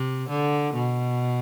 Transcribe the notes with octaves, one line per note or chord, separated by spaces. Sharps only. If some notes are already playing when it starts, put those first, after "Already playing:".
Already playing: C3
D3
B2